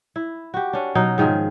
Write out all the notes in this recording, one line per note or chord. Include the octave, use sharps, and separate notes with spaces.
E4
F#4 G4
C#4 D4
B2 F#3 D#4
G#2 D#3 F3 G#4